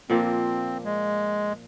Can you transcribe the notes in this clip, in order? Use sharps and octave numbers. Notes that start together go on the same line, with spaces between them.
A#2 F3 A#3 C4
G#3